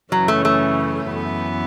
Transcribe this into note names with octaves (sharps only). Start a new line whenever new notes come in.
F#2 C#3 E3 F#3 C#4
A3
A3
F#2 E3 B3